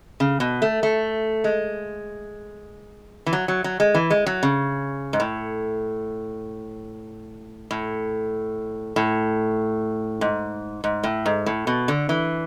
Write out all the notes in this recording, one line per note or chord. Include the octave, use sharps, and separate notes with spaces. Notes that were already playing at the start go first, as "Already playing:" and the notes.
C#3
B2
A3
A3
G#3
E3
F#3
F#3
F#3
G#3
E3
G#3
F#3
C#3
G#2
A2
A2
A2
G#2
G#2
A2
G#2
A2
B2
D3
E3